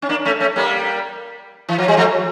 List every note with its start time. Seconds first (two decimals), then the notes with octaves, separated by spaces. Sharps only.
0.02 C#4
0.09 A#3 D4
0.25 A3 C#4
0.40 A3 C#4
0.56 G3 A#3
1.69 E3
1.78 F3
1.88 G3
1.97 F3 A3